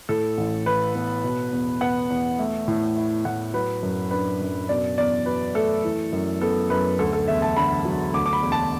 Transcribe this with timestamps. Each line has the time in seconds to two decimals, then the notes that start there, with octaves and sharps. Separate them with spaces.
0.09 A2 A4
0.37 A1
0.66 E3 B4
0.95 B3
1.24 B2
1.53 E2
1.81 B3 F#5
2.10 E2
2.39 A3
2.68 A2
2.97 E4
3.25 A2 F#5
3.54 F#3 B4
3.83 F#2
4.11 D4 B4
4.40 F#2
4.69 B2 D5
4.98 E2 D5
5.26 F#3 B4
5.55 A3 A4
5.84 E3
6.12 F#2
6.41 B3 A4
6.70 F#2 B4
6.99 D2 A4
7.13 A4
7.28 E1 E5
7.42 A5
7.56 D3 B5
7.85 F#3
8.14 D2 D6
8.26 D6
8.33 B5
8.42 E1
8.52 A5